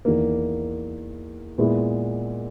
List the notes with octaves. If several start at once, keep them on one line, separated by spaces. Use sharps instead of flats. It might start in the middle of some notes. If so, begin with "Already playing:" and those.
E2 D#3 A#3
A#2 G#3 B3 E4